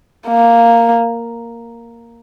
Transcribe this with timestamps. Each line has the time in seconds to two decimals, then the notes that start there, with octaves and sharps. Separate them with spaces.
0.28 A#3